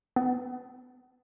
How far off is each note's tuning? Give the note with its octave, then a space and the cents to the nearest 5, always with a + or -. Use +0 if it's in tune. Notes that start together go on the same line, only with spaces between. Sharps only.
B3 +30